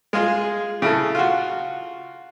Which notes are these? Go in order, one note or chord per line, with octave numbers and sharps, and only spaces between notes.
G#3 F4 G#4
C#3 E4 A4
F4 F#4